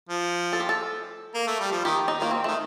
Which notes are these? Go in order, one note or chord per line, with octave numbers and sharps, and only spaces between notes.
F3
A4
G4
A4
A#3
A3
G3
F3
D#3 G4
D#4
D#3 A#3
C4
D#3 A3